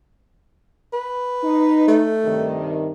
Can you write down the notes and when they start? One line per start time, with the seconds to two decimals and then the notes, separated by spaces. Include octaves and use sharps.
0.93 B4
1.44 D#4
1.88 A3
2.24 G2 C3 D#3